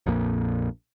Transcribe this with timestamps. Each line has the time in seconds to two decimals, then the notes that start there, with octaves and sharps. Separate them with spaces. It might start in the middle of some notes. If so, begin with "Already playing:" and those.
0.06 A#1 F2 A#2